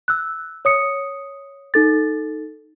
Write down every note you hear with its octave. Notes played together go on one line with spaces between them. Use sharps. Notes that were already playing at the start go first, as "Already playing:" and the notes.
E6 F#6
C#5 D#6 C#7
D#4 A4 A6